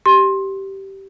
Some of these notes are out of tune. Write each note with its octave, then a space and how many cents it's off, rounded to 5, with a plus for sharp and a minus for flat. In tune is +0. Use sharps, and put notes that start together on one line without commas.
G4 -15 C6 +20